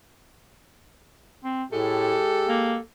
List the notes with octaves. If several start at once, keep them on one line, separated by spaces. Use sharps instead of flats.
C4
A2 G#3 G4 A4
A#3